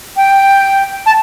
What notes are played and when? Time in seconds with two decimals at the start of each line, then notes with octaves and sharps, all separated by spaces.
0.17 G5
1.06 A5